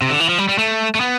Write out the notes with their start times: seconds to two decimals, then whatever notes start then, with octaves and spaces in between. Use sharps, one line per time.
0.02 C3
0.10 D3
0.20 E3
0.29 F3
0.38 G3
0.49 G3
0.58 A3
0.95 A3
1.01 B3